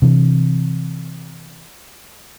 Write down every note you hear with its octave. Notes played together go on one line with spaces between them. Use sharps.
C3 E3